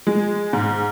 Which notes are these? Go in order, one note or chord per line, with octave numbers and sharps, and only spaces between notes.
G#3
G#2